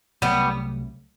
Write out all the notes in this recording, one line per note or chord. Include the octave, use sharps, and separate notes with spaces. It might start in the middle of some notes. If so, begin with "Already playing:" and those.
C2 C3 F#3 G3 A3 B3